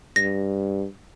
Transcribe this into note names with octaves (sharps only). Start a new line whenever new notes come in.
G2 A#6